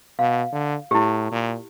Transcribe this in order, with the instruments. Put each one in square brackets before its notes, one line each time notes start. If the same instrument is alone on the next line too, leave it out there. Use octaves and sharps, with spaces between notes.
[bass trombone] B2 [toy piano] F5
[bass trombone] D3
[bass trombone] A2 [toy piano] E4 G4
[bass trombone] A#2